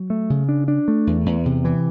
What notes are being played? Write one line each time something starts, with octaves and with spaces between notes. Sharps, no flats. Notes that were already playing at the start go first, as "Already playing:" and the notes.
Already playing: F#3
A3
C#3
D4
D4
A3
E2
E2
C3
E3